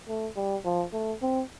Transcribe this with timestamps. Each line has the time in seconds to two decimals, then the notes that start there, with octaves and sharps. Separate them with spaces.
0.08 A3
0.37 G3
0.65 F3
0.93 A3
1.22 C4